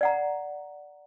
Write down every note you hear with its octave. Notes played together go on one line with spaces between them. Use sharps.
D5 F#5 A#5